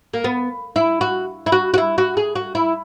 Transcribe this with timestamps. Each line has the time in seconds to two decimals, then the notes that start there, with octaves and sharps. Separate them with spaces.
0.14 A#3
0.24 B3
0.76 E4
1.01 F#4
1.46 E4
1.52 F#4
1.74 F#4
1.78 E4
1.98 F#4
2.17 G#4
2.35 F#4
2.55 E4